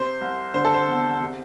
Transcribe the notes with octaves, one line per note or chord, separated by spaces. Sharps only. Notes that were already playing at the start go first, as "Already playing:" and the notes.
Already playing: C3 C5
C2
D3 C5
A4
C5
E2
C3